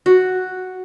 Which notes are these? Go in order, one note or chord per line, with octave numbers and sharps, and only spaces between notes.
F#4